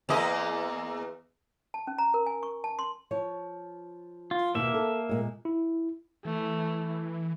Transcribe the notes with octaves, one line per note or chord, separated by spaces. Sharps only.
E2 A#3 D#5
A5
C#4
A#5
A#4
G#5
C#6
A5
C6
F3 C#5
F4
D#2 B2 A#3 E5
A4
A#2 G#3
E4
E3 A3